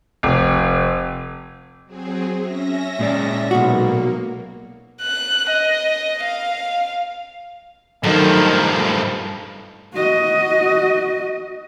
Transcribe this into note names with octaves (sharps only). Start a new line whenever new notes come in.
F1
F#3 C4 G#4
C#4 E5 A#6
A#2 G#3 D5
B1 A#3 F#4
F#6
D#5
F5
G2 D#3 F3 F#3 A3 D#5
F#4 D#5